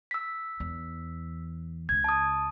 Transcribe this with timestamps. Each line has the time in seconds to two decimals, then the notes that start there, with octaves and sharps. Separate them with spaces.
0.11 E6 B6
0.60 E2
1.89 C#2 C#3 G#6
2.04 A5 D#6